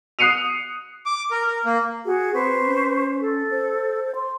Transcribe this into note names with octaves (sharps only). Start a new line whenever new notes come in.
D#6 F#6 C7 C#7 D#7 F7
D6
A#4
A#4
A#3
F#4 G#4
C4 B4 C5 C#6
C#4
A4
C5
C6